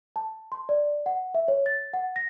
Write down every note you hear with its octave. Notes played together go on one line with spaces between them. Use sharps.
A5
C6
D5
F#5
E5
C#5
A6
F#5
A#6